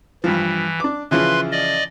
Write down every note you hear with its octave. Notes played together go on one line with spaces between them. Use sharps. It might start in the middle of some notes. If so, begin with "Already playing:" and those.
G2 E3 F3
D4 D6
C#3 E3 F3 B4 C6
D5 D#5